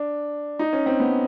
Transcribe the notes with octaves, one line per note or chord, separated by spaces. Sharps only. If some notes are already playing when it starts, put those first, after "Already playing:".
Already playing: D4
D#4
C#4
C4
B3